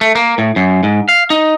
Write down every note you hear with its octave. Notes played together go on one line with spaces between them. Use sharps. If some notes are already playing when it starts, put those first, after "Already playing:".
A3
A#3
A2
F#2
G#2
F5
D#4